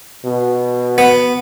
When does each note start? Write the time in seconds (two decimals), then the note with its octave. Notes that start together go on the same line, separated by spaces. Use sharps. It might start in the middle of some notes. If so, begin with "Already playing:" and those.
0.25 B2
0.98 B3